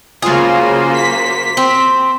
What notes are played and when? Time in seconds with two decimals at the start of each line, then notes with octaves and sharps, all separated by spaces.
0.22 C#3 F#3 A#3 F4 F#4 G#4 C5
0.93 B6
1.57 C4